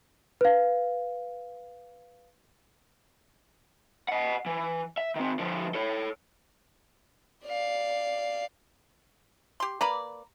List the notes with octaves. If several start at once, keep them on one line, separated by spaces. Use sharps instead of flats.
B4 F5
D#5 F#5
E3
E5
D#3 C4
D3 F3
A4 C#5
D5 F5
G4 C6
A#3 B4 D5 A#5 B5